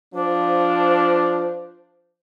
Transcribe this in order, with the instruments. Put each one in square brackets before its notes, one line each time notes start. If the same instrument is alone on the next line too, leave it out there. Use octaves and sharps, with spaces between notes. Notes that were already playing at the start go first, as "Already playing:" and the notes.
[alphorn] F3 [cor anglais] D4 [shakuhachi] C5